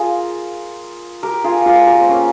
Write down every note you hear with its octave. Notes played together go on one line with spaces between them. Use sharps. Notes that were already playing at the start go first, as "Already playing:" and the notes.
Already playing: F4 G#4 A#4
G4 A#4
F4 G#4
F4 G#4
G4 A#4
C4
A#3 C#4